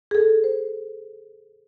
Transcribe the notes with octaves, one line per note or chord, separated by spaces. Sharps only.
G#4 A4
C5